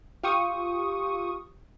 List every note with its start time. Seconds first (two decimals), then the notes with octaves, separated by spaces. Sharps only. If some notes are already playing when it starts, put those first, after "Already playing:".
0.23 F4 G4 C#6 D#6